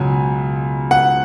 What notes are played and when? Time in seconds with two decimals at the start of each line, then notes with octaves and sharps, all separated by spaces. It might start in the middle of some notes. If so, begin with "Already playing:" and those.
Already playing: C#2 B2 F#3 G#5
0.91 F#5